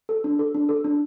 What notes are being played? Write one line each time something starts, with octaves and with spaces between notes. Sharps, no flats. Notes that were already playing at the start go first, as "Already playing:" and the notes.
A4
D4
A4
D4
A4
D4